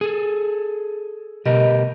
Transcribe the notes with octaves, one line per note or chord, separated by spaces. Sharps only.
G#4 A4
B2 G4 A#4 D#5